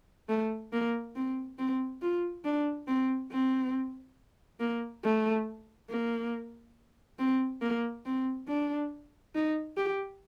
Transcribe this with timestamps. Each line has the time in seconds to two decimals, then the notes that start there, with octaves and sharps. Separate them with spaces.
0.29 A3
0.73 A#3
1.16 C4
1.58 C4
2.02 F4
2.45 D4
2.87 C4
3.31 C4
4.60 A#3
5.04 A3
5.89 A#3
7.19 C4
7.61 A#3
8.05 C4
8.48 D4
9.35 D#4
9.77 G4